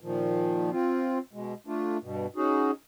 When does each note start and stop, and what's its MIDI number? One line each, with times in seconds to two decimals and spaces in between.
0.01 0.71 46
0.01 0.71 51
0.01 0.71 53
0.71 1.19 60
0.71 1.19 65
1.33 1.54 47
1.33 1.54 56
1.67 1.97 57
1.67 1.97 62
1.67 1.97 65
2.02 2.27 43
2.02 2.27 47
2.36 2.71 61
2.36 2.71 63
2.36 2.71 66
2.36 2.71 68